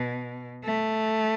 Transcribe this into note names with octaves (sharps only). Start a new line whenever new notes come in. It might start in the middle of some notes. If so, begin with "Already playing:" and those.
Already playing: B2
A3